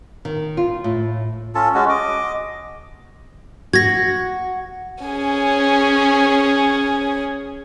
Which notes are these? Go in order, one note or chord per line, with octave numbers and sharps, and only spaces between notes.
D#3
F4
A2
C#4 F4 A4 A5
G#3 C#4 F#4
D#5 D6
F#4 G#6 A#6
C#4 G#4